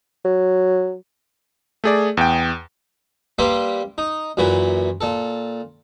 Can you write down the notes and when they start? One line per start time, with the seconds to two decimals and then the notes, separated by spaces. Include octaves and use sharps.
0.25 F#3
1.84 A3 G#4 D5
2.17 E2 G5
3.39 G3 A#3 G4 B4 E5 C6
3.98 D#4
4.37 F#2 A#2 E3 F#4 B4
5.01 A#2 A4